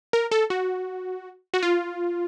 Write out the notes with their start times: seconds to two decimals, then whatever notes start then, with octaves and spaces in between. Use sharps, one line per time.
0.13 A#4
0.31 A4
0.50 F#4
1.54 F#4
1.63 F4